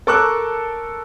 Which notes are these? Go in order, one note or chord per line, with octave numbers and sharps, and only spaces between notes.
A4 A#4 C#6 D6 E6 F#6